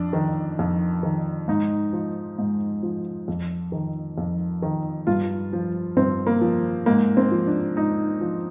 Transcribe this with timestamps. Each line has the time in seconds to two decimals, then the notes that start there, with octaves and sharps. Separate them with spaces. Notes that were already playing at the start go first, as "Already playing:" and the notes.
Already playing: F2 D4
0.13 D#3
0.59 F2
1.03 D#3
1.48 G#2 D#4
1.93 F3
2.38 G#2
2.83 F3
3.28 F2
3.72 D#3
4.18 F2
4.62 D#3
5.07 G2 F4
5.53 F3
5.97 G2 C4
6.27 A#3
6.41 F3
6.86 G#2 A#3
7.17 C4
7.31 F3
7.47 D4
7.76 G#2 D#4
8.21 F3